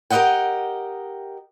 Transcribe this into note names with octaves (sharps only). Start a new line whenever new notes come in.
G4 A#4 B4 D#5 F#5 G5